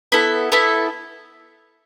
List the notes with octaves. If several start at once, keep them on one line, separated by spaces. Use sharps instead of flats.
B3 E4 A4
B3 E4 A4